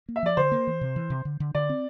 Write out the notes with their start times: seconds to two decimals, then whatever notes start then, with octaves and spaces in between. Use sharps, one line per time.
0.09 A#3
0.16 E5
0.23 F3 D5
0.37 D3 C5
0.52 A#3
0.67 E3
0.81 C3
0.96 E3
1.10 C3
1.25 D3
1.40 D3
1.55 D3 D5
1.69 C4